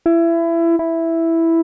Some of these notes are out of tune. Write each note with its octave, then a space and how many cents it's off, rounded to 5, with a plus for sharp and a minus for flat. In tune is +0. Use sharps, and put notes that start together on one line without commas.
E4 +25
E4 +0